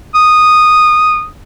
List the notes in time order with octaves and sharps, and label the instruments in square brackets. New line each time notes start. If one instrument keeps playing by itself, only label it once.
[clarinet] D#6